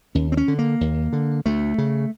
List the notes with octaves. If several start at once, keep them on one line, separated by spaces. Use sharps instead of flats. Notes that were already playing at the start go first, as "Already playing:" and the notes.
D#2 C#4
C4
C#4
D3
A#3
D#2
D3
D2 A3
C#3